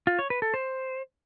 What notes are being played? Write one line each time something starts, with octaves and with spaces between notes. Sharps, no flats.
F4
C#5
B4
A4
C5